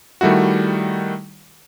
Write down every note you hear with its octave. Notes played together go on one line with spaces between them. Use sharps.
D#3 G3 A3 E4 F#4